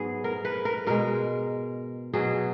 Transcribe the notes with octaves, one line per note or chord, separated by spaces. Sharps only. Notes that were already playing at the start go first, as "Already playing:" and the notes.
Already playing: G#2 F#3 B3 G#4
A#4
B4
A#4
B2 G#3 A#4
B2 F#3 G#4